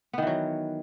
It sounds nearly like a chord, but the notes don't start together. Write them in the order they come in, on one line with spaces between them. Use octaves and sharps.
B3 D#3 E3 F#3